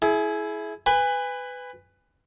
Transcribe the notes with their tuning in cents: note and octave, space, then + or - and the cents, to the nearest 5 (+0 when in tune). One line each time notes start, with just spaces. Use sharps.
E4 +0 G#4 +30
B4 +15 G#5 -30 B5 +10